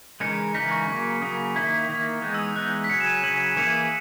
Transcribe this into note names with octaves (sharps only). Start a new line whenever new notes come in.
C#3 E3 G#3 D#4 A#4 C#7
C#3 E3 G#3 D#4 A#4 B6
C#6
C#3 F#3 A#3
C#3 F#3 A#3 D#6
D#3 A#3 E4
D#3 A#3 E4
E3 G#3 B3 D#4
E6
D#6
E3 G#3 B3 D#4 F#6
B6
C#3 F#3 C#4 C#7
E7
D#7
C#3 F#3 C#4 F#7
E3 A#3 E4 G#4 B4 C#7